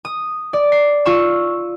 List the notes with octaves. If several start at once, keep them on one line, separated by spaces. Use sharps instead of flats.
D#6
D5
C7
F4 C#6 E6